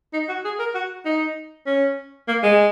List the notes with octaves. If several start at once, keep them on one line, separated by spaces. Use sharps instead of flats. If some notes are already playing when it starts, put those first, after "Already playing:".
D#4
F#4
G#4
A#4
F#4
D#4
C#4
A#3
G#3